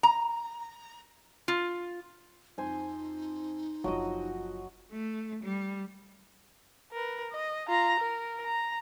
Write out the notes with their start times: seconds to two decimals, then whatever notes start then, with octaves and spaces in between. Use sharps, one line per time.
0.03 A#5
1.48 F4
2.58 F2 D#4 C5 G#5
3.84 F#1 F3 F#3 D4 F#4 D#5
4.92 A3
5.43 G3
6.92 A#4 B4
7.31 D#5
7.68 F4 A#5
8.00 A#4
8.45 A#5